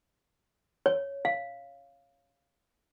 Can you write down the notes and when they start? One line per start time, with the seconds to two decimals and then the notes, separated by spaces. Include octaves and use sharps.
0.86 C#5
1.25 F5